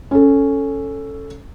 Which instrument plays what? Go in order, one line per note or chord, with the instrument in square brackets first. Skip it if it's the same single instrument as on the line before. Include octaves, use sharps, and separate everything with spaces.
[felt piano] C#4 A4